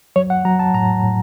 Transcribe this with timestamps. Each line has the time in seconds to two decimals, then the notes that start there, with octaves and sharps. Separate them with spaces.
0.16 F#3 C#5
0.30 F#5
0.45 F#3 A#5
0.59 A5
0.74 A2 A#5
1.03 A2